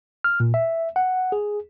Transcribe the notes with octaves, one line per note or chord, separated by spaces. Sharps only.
F6
A#2
E5
F#5
G#4